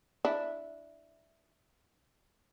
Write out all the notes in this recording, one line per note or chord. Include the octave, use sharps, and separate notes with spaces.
D4 E4